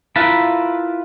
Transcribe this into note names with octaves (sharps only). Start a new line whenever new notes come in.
E4 F4 A#4 B4 A5 B5